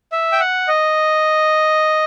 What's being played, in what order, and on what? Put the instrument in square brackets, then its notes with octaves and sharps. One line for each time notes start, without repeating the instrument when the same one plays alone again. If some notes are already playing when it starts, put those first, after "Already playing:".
[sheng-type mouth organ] E5
G5
F#5
D#5